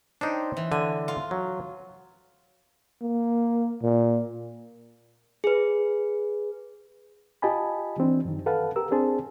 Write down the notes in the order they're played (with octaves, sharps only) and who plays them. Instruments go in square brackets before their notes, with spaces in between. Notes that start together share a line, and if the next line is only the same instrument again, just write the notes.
[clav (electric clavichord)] D4 D#4 [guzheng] C5 C#5 G5
[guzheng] E3
[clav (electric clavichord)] D3 [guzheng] G#5
[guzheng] F4
[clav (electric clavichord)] F#3
[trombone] A#3
A#2
[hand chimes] G#4 B4
[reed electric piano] F4 G4 D#5 G#5 A5 B5
E3 C4 D4
F#2 D#3
A4 B4 F5 F#5 A5
G4 A#4 E6
C4 D4 G#4 C5 A5